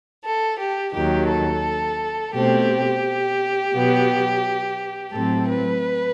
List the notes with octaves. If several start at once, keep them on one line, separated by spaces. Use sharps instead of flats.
A4
G4
D#2 D#3 F#3 G4
A4
B2 A3 C4 G4
B2 F#3 B3
A2 F#3 C4 A4
B4